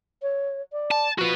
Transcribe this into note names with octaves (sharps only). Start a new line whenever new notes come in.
C#5
D5
A5
F3 F#4 B4